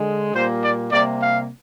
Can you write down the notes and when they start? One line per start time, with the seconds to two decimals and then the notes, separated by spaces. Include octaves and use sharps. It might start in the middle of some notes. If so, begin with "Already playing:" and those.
Already playing: D3 G#3
0.34 A#2 G3 A#3 C5
0.63 D5
0.92 C3 G3 A#3 D5
1.21 F5